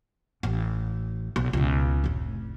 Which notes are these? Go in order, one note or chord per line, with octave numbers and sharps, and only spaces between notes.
A1
B1
C#2 B2
F1 A2